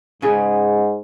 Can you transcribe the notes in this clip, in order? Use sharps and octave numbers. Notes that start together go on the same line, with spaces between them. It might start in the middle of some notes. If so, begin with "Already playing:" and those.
G#2 C#3 G#4